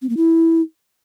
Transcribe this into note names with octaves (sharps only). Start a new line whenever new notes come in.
C4
A#3
E4